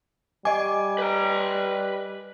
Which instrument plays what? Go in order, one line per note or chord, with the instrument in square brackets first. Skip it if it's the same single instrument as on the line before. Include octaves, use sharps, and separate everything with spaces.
[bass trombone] G3 [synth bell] D#5 D6 [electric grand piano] G#5
[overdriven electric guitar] B4 A#5